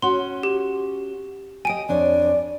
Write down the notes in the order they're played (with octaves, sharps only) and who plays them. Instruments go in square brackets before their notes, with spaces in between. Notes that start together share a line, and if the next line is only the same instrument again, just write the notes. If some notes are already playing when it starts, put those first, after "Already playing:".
[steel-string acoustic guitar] C#4 F#4 [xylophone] C6
[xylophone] G4
[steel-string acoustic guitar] G4 D#5 [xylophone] G#5 D7
[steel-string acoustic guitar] F2 D4 C#5 [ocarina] D5